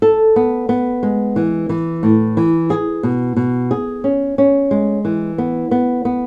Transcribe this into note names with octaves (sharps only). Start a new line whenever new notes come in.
A4
B3
B3
G#3
E3
E3
A2
E3
G#4
B2
B2
G#4
C#4
C#4
G#3
E3
B3
B3
B3